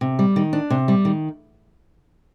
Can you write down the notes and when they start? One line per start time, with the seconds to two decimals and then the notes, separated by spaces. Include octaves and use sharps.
0.01 C3
0.19 G3
0.36 D#3
0.53 D4
0.70 C3
0.88 G3
1.05 D#3